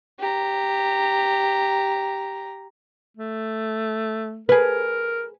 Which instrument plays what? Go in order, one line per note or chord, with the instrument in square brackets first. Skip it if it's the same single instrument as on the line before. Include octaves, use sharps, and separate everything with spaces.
[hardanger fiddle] G4 A#5
[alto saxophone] A3
[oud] G#4 B4 [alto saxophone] A#4